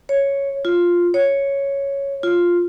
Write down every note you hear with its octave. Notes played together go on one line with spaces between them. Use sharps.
C#5
F4
C#5
F4